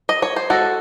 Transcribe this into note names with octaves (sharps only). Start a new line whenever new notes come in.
D#5
C#5
C5
G#3 F#4 A4